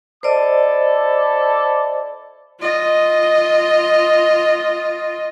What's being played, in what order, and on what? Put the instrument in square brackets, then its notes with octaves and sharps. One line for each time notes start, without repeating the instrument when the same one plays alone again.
[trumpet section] E4 A4 D6 [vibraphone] C5 D5 D#5
[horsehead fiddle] F4 D#5